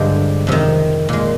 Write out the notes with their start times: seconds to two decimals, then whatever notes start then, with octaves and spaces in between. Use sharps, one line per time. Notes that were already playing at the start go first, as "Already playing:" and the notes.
Already playing: G2 D3 F3 G#3 G4
0.47 F2 C3 D#3
1.09 A#2 G#3